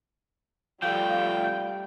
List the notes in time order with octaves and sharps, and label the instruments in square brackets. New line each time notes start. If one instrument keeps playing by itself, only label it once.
[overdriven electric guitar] F3 A3 [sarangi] G3 [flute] F5 [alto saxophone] G5